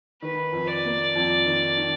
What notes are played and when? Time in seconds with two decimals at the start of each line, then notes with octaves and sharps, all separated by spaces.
0.22 D#3 B4
0.52 F2
0.68 D5
0.85 A#3
1.15 F2
1.46 D#3
1.78 D#3